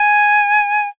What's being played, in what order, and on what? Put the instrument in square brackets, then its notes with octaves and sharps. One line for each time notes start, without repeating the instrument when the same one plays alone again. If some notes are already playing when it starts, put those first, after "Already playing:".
Already playing: [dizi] G#5